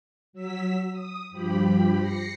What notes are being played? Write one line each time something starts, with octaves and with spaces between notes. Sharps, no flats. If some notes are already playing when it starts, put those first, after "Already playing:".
F#3 E6 B6
D#6
G2 F3 G4 B5
A#6 C7 C#7